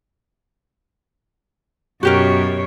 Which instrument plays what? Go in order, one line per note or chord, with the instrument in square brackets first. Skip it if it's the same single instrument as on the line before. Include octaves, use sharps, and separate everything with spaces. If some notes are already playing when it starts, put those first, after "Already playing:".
[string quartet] F#2 B2 C#5 [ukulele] F#4 G4 A#4